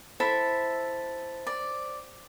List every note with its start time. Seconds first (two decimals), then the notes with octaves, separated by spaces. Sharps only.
0.20 E4 A4 C5 E5 A6 B6
1.47 D5